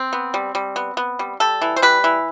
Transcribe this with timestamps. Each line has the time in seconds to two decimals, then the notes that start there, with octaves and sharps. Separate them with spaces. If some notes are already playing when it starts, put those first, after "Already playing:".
Already playing: C4
0.13 B3
0.34 G3
0.55 G3
0.76 B3
0.97 B3
1.19 G3
1.40 G3 A4
1.62 E3
1.76 C5
1.82 G3 B4
2.04 E3